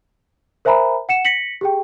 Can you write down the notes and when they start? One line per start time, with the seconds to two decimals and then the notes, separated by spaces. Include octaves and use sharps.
0.65 A#4 C5 E5 G#5 A#5 B5
1.09 F#5 C#7 E7
1.25 A#6 B6 C#7 F#7
1.61 G4 G#4 G5